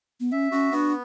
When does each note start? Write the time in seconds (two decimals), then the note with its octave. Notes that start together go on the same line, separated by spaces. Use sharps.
0.20 B3
0.32 C#4 E5
0.51 C#4 F#4
0.72 B3 D4